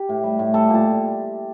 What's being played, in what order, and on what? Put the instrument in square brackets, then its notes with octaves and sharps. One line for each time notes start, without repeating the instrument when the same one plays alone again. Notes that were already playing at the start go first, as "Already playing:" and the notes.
Already playing: [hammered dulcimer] G4
A2
G3
A2
G3 A4
A#2 A4
G3